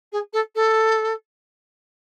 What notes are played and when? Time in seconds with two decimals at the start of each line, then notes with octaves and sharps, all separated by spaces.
0.12 G#4
0.33 A4
0.55 A4